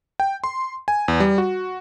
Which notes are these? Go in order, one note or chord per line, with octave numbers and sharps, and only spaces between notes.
G5
C6
G#5
E2
G3
F#4